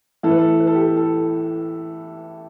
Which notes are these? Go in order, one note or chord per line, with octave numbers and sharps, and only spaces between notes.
A2 E3 A4 B4
A4
B4
A4
G4
A4
A4